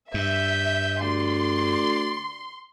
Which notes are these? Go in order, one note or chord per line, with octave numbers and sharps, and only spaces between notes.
G2 E5 G6
D2 D5 C6